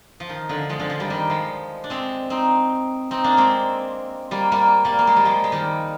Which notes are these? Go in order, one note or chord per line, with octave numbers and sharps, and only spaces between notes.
F3
D#3
D3 F3
F3 G#3
D3 F3
F3 G#3
D#3 G3
D#3 G3
F3 G#3
D4
G#3 C4
C4 D#4
C4 D#4
A#3 D4
G#3 C4
G3 A#3
G3 A#3
G3 A#3
A#3
G#3
G3
F3 G#3
G#3
D#3 G3